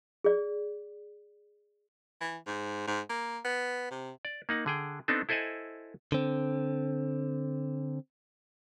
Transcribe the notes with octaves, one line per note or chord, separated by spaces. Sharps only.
G#4 D5
E3
G#2
G#2
A#3
B3
C3
D5
A#3 D#4 F#5
D3 G#4 G5
B3 C4 D4 D#4 A4
E4 A4 C5 D#5 F#5 G#5
D3 C4